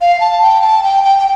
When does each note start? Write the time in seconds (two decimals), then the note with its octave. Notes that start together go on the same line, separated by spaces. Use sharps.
0.01 F5
0.20 A5
0.42 G5
0.62 A5
0.83 G5
1.03 G5
1.18 G5